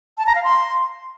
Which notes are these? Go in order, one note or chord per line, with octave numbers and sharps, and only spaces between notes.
A5
A#5
F5
C6